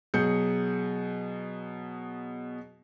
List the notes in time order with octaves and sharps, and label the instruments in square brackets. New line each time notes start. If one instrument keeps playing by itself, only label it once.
[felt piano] B2 F#3 G#4 G6 C#7